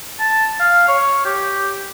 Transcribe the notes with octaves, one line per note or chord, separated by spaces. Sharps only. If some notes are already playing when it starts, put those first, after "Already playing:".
A5
F5
C#5
G4